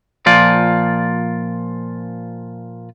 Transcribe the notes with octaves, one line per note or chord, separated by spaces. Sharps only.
A#2 F3 F4 D5